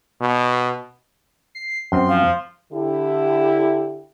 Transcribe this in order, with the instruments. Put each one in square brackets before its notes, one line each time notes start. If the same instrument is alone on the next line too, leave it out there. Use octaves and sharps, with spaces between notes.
[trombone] B2
[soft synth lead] C7
[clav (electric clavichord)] F#2 C4 [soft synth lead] C6
[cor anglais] F3 [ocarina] F5
[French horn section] D3 E4 G4